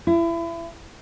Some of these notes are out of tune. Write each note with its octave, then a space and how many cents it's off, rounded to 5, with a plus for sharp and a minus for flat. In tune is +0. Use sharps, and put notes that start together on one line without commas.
E4 +30